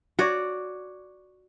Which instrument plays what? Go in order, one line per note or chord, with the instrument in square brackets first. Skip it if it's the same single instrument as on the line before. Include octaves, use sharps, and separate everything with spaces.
[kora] F#4 C#5 D5